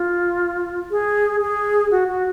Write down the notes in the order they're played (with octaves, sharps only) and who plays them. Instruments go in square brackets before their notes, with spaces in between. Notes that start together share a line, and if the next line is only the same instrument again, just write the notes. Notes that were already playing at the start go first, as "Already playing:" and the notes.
Already playing: [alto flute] F4
G#4
G#4
F#4
F#4